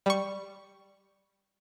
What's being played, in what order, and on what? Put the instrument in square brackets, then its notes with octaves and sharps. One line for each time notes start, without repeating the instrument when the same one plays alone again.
[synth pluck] G3 C#6